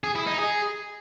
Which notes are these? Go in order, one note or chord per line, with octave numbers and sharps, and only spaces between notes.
G#4
E4
D#4
G#4